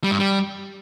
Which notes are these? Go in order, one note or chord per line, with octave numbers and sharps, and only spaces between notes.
G3
G2
G3